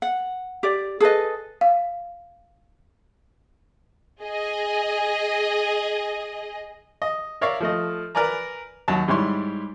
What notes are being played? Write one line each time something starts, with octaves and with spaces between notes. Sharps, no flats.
F#5
G4 D5
G#4 A4 B4 D#5
F5
G#4 D#5
D#5
A#4 C#5 D5 E5 F5
F3 A3 D#5
A#4 B4 D5 G#5 A#5
D#2 F#3 A5
G#2 G3 E4 C#5 C6